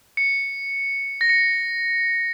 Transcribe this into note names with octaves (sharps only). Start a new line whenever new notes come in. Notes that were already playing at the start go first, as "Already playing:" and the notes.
C#7
A#6
C#7